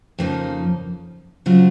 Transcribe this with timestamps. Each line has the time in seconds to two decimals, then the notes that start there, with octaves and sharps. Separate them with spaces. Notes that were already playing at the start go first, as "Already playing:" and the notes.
0.19 F2 C#3 F3 A#3 D#4
1.46 C#3 F#3 C4 F4